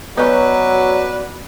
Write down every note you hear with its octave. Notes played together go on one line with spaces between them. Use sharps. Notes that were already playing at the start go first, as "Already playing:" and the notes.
F#3 B3 C#4 D#4 F#4 B4 D5